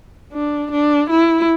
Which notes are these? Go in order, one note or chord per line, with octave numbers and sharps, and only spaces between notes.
D4
D4
E4